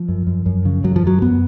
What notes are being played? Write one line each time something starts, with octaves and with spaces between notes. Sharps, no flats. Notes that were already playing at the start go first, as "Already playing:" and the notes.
Already playing: F3
F#2
F#2
F#2
C#3
F#2 F#3
F3
F#2 F#3
F#2 B3